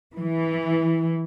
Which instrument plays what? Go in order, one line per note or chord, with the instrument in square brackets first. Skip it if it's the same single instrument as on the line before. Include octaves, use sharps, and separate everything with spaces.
[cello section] E3